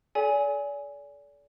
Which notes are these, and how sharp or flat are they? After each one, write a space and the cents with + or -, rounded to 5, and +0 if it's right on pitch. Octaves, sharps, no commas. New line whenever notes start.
A4 -35 D5 -35 G#5 +0